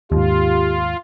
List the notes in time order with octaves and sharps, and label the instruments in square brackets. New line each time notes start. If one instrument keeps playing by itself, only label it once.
[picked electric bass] D#2 G#2 [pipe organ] F4 [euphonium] G4